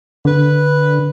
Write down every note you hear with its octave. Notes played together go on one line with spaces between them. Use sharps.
D3 B4